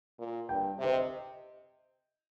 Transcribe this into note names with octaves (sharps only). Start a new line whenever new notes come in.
A#2
G2 G5
C3
C5
D#5